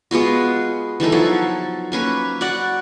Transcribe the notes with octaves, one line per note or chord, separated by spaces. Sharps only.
G#3 B3 F4 F#4
E3 G3 D#4 A4
F3 F#3 F#4 A4
A#3 C#4 B4
F#4 D5 F#5